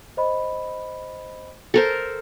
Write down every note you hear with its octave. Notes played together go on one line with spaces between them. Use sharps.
C5 D#5 B5
A4 A#4 C5